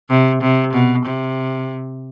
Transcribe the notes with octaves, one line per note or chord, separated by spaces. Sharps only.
C3
C3
B2
C3